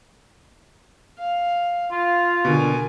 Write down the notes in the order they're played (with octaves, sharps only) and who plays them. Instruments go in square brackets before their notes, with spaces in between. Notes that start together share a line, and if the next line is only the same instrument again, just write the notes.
[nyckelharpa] F5
[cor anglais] F4 [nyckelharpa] F5
[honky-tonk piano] B2 [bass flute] D3 [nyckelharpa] A#4 G#5